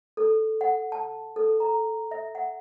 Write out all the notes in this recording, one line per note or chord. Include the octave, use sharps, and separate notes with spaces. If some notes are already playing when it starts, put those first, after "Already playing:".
A4
F#5
A5
A4
A#5
E5
F#5